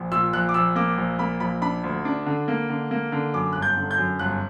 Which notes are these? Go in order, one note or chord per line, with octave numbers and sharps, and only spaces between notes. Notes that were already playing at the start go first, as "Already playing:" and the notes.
Already playing: A#1
A#2 E6
A#1 F#6
D6
A#1 E6
A#3 D6
A#1
A#3 B5
A#1 B5
D4 B5
D2
D4
D3
A#3
D3
A#3
D3
F#2 D6
G1 F#6
G6
D3
G6
F#2
G1 F#6